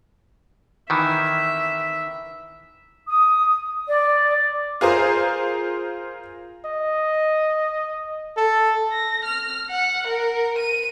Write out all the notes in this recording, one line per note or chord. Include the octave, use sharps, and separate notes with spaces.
D#3 E3 E5
D#6
D5
F4 G#4 A#4 C5
D#5
A4
A#6
F6
F#5
A#4
D#7